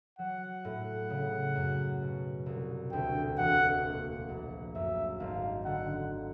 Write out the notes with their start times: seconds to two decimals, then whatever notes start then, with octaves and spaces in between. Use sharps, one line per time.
0.19 F#3 F#5
0.65 A2
1.10 C#3
1.55 F#2
2.02 B2
2.46 C2
2.92 D2 G5
3.38 E1 F#5
3.84 A#2
4.29 A#1
4.74 F#2 E5
5.20 G#1 F5
5.65 D3 F#5